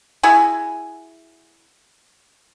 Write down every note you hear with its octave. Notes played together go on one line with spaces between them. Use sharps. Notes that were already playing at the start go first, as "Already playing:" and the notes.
E4 F#4 G#4 G#5